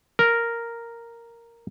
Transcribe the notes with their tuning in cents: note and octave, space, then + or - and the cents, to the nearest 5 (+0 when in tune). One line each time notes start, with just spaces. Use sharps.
A#4 -5